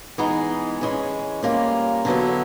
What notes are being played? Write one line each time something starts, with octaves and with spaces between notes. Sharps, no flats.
E3 G#3 B3 D#4 G#4
E3 G#3 C#4
G3 A#3 C#4 F4 A#4
D3 F#3 B3 E4